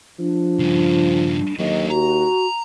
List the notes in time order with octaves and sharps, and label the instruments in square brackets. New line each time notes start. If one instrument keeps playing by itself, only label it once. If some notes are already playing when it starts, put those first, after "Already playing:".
[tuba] F3 [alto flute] D4
[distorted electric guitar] G2 C#3
[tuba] D#2 [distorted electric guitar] D3 F#3 [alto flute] D#5
[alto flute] F#4 [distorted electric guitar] A#5